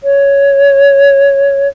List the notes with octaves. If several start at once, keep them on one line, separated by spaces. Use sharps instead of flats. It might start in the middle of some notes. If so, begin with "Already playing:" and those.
C#5